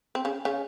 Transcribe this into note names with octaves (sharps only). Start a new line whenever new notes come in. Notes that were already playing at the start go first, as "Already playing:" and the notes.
C4
C#3 C#4
C#3 C#4